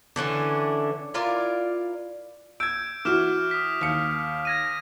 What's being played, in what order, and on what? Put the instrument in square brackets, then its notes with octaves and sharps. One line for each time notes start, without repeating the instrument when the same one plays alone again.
[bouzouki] D3 E3 C#4 D4
E4 F4 A#4 D5
[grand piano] E6 G#6 [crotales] G6 D7
[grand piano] E3 F#4 [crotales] D6 F6 E7
[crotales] D#6 B6
[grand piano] D#2 C#7
[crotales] G#6 A#6 D#7